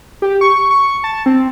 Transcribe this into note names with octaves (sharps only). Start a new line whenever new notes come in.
G4
C#6
C#6
A5
C4